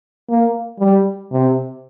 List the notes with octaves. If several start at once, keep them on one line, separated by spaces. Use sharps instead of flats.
A#3
G3
C3